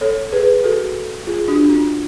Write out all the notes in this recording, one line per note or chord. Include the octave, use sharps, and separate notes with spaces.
A4 C#5
G#4 B4
F#4 A4
F4 G#4
D4 F#4
C#4 F4